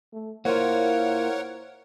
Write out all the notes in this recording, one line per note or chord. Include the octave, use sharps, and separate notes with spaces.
A3
A#3 E4 F4 A#4 C5 C#5 F#5